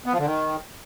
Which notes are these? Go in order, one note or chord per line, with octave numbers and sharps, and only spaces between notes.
B3
F3
D3
D#3